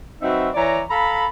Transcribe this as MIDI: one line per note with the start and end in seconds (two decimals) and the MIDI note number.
0.22 0.48 54
0.22 0.48 60
0.22 0.48 63
0.22 0.48 66
0.22 0.48 71
0.22 0.48 76
0.54 0.81 52
0.54 0.81 73
0.54 0.81 74
0.54 0.81 82
0.90 1.25 69
0.90 1.25 77
0.90 1.25 82
0.90 1.25 83